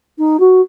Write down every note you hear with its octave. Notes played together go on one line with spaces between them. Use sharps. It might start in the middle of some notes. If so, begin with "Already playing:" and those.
D#4
F#4